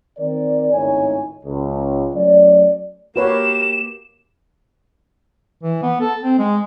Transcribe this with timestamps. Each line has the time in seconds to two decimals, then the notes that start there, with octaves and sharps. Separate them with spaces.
0.19 D#3 C4 A#4 D5
0.72 G#1 C#2 A2 D#4 C#5 G#5
1.45 C#2
2.13 F#3 A3 C#4 D5
3.16 A#3 F#4 G4 B4 C#5 E7
5.63 E3
5.83 B3
6.01 A4
6.23 C4
6.39 G#3